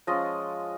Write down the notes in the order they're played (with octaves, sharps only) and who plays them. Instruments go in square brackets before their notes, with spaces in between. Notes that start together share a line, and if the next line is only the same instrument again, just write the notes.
[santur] F3 G#3 C#4 D#5